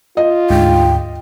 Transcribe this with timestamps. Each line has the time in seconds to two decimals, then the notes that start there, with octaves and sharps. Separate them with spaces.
0.17 F4 D#5
0.50 D2 G#2 G5